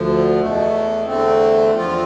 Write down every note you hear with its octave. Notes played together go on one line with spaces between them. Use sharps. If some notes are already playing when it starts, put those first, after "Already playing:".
Already playing: D2 D3 F3
E2 B2 A3
E2 D3 A3 C4
E2 D3 F3 C4 F4